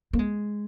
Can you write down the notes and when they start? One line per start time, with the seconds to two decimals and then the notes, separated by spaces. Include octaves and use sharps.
0.13 A#3
0.19 G#3